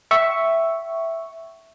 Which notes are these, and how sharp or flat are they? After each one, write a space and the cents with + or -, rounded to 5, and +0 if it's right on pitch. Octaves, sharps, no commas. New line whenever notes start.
E5 +0 G5 -45 C#6 +0